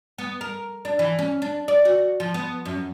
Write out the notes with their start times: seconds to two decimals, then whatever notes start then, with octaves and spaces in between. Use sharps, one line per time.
0.18 B3
0.41 A#4
0.85 D4
0.99 E3
1.19 C#4
1.42 D4
1.68 D5
1.85 F#4
2.20 F3
2.34 B3
2.65 F#2